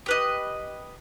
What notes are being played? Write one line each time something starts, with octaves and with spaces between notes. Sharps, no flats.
G4 B4 D#5